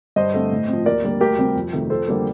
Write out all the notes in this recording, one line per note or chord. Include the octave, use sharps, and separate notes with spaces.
G2 C5 D#5
D3 A3 C4
A2
F3 C4
D#2 A#4 D5
D3 G3 A#3
D2 G4 A#4
C3 G3 C4
F2
C3 D#3 A3
F2 A4 C5
D3 G3 A#3